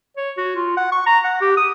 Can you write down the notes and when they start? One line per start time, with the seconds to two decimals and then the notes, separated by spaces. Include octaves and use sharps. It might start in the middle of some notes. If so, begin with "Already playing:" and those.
0.17 C#5
0.38 F#4
0.56 F4
0.77 F#5
0.92 C#6
1.06 A#5
1.24 F#5
1.41 G4
1.57 D#6